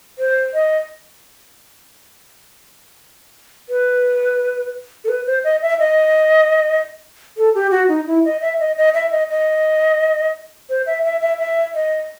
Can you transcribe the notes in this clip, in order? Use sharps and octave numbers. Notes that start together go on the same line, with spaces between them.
C5
D#5
B4
A4
B4
C5
D#5
E5
D#5
A4
G4
F#4
D#4
E4
D#5
E5
D#5
D#5
E5
D#5
D#5
C5
E5
E5
E5
E5
D#5